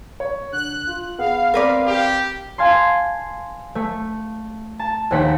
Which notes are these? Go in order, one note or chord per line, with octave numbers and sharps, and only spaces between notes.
C#5
D3 F#6
F4
B3 G#4 F5 F#5
C4 A#4 B4 D5
G4
F5 G#5 A5 C6
A3
A5
A#1 D#2 F#5 B6 C#7